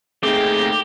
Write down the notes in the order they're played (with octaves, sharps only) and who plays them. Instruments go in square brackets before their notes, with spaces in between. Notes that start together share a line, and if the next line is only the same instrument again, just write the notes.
[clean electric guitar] A3 D#4 [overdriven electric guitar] A#3 C4 [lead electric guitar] G4 [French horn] G#4